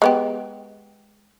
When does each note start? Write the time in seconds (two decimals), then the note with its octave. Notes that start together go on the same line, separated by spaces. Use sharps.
0.02 G#3 B3 G4